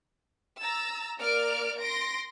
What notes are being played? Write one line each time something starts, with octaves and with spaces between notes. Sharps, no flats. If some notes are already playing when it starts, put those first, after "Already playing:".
A#5 E6 A6
A#3 A#4 D5 F6 D7
C6 A#6 D7